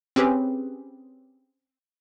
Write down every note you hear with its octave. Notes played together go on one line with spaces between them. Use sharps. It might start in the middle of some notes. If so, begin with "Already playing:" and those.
C4 C#4 G4 G#4 B4